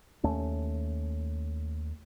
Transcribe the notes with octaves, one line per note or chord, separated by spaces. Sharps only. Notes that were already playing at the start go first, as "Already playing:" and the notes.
D#2 A3 C#4